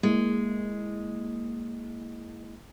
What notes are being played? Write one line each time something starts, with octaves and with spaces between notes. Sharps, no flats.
G#3 A#3 E4